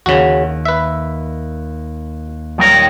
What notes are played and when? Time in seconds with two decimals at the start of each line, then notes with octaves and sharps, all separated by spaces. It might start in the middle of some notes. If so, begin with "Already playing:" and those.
0.06 D#2 C#3 F#4
0.65 B4 E5
2.58 A#2 D#3 G3 D#4 A#4 C#5